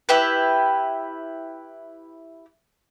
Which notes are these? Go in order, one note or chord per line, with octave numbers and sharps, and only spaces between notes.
E4 G4 B4